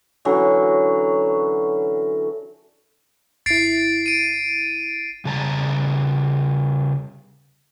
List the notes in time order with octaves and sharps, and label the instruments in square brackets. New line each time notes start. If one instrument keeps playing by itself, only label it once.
[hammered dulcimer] D3 E3 F#3 C#4
[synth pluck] G#1 E4 [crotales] A6 C7 D7
[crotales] D7 D#7
[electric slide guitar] C#3 G3 A5 A#5